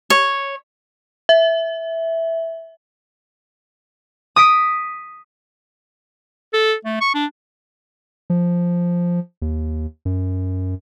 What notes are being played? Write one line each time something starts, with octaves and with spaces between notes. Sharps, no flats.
C#5
E5
D#6 B6 D7
A4
A3
C#6
D4
F3
D#2
F#2